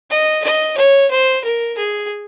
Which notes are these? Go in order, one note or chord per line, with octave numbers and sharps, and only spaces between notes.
D#5
D#5
C#5
C5
A#4
G#4